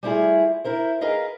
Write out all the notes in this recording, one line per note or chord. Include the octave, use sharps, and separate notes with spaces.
G3 A3 B3 E4 F4 G#4
E4 A#4 C5
G#4 A#4 B4 D#5 F5